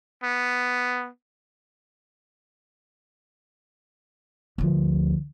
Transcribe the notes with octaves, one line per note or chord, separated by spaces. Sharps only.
B3
D2 F3